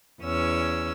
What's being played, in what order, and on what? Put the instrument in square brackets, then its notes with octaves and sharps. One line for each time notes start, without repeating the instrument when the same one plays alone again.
[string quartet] E2 C#4 C#5 E6